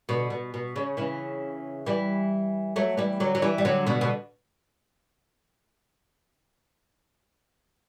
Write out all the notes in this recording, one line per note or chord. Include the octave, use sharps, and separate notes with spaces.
B2 D3
B2
B2
C#3
C#3 E3
E3 G3
F#3 A3
E3 G3
D3 F#3
F#3
E3 G3
G3
D3 F#3
B2 D3
B2